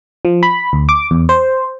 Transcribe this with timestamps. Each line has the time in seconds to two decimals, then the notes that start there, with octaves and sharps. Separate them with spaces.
0.25 F3
0.43 B5
0.73 D2
0.89 D6
1.11 E2
1.29 C5